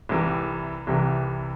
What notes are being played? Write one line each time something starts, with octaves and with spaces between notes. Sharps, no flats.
C2 C3 E3
C2 C3 E3